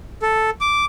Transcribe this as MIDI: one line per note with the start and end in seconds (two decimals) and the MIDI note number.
0.22 0.50 69
0.61 0.85 86